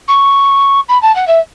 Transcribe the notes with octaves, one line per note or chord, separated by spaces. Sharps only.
C#6
B5
A5
F#5
E5